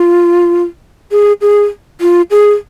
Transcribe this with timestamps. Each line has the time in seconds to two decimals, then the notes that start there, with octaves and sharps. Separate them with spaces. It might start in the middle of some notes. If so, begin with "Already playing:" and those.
Already playing: F4
1.12 G#4
1.41 G#4
2.01 F4
2.31 G#4